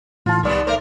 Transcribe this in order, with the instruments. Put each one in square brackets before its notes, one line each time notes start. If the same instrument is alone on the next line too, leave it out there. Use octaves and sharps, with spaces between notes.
[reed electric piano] A2 E3 A5 [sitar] F4
[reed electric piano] C2 D5 [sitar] D#3 G3 B3
[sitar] A3 A#4 C5